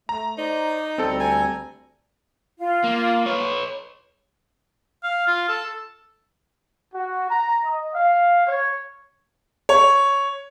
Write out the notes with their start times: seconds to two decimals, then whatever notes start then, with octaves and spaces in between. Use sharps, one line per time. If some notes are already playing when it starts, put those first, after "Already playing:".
0.09 A3 A#5
0.38 D#4 C5 D5
0.98 D2 G3 C4 A4 A#5
1.20 G#5
2.59 F4
2.84 A#3
3.26 B4 C#5
5.03 F5
5.27 F4
5.48 A4
6.95 F#4
7.31 A#5
7.65 D#5
7.94 F5
8.47 C#5
9.69 C#5